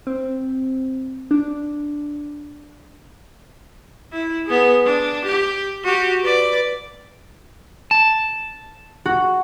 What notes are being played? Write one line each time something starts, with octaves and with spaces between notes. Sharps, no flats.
C4
D4
E4
B3 G#4
D4
G4
F#4 G4
B4 D5
A5
F#4